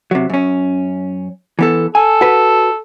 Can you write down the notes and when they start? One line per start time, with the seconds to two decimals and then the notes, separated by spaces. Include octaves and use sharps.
0.11 C3 F#3
0.30 F#2 C#4
1.59 E3 B3 A4
1.95 A4 G#5
2.21 F#4 B4